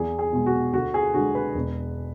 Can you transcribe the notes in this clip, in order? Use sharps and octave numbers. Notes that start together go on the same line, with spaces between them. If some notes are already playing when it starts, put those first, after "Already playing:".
Already playing: E2 G#4
G#4
B2 G#3
F#4
D2 F#4
G#4
D3 G#3 F#4
B4
E1